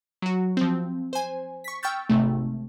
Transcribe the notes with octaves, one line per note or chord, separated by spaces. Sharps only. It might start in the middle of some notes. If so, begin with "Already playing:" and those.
F#3 F#4
F3 C4
C5 G#5
C#6 B6
G5 C#6 E6 F6 G6 A6
G#1 C3 A3